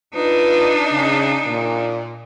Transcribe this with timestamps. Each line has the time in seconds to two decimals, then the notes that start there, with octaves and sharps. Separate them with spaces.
0.14 D4 D#4 F4 B4
0.92 C#3
1.47 A#2